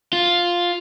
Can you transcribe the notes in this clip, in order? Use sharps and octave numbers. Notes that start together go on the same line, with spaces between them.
F4